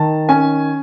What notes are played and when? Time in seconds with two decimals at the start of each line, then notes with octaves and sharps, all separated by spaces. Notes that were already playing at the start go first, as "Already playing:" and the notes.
Already playing: D#3 A5
0.29 C#4 G#5